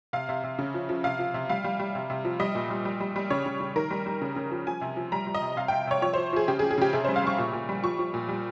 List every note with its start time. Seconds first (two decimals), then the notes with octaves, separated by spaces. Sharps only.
0.13 C3 F5
0.29 C3
0.44 C3
0.59 C#3
0.74 F3
0.89 F3
1.04 C3 F5
1.19 F3
1.34 C3
1.49 G3 F5
1.64 G3
1.80 G3
1.95 C3
2.10 C3
2.25 F3
2.40 G3 D#5
2.55 A#2
2.70 G3
2.85 G3
3.00 G3
3.16 G3
3.30 C#3 C#5
3.46 C#3
3.60 C#3
3.76 D#3 A#4
3.91 G3
4.06 G3
4.21 C#3
4.36 C#3
4.51 F3
4.67 F3 G#5
4.81 C3
4.96 F3
5.12 G3 A#5
5.27 G3
5.35 D#5
5.42 C3
5.57 C3 F5
5.68 G5
5.72 C3
5.87 C3 C#5
6.02 F3 C#5
6.14 C5
6.18 F3
6.33 F3 G#4
6.48 C#3 G4
6.59 G#4
6.63 C#3
6.71 G#4
6.78 C#3 G4
6.93 C3 G#4
7.05 C5
7.08 G3
7.16 F5
7.23 G3 C#6
7.38 A#2
7.53 A#2
7.69 G3
7.83 F3 C#6
7.99 F3
8.14 A#2
8.29 G3